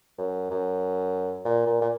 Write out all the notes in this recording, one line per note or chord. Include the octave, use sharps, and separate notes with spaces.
F#2
F#2
A#2
A#2
A#2